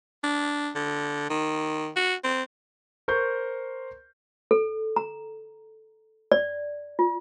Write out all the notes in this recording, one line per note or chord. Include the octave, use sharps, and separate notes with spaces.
D4
D3
D#3
F#4
C4
A#4 C5 C#6 G6
A4
A#5
D5
F4